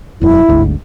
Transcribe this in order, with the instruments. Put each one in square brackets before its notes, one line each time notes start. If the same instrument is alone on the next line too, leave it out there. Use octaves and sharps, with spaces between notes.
[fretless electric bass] E1 F#2 [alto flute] E4
[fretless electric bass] G1 D2 G#2